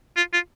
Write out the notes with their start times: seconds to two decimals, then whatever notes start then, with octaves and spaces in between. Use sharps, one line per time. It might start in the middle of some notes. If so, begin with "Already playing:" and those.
0.17 F4
0.33 F4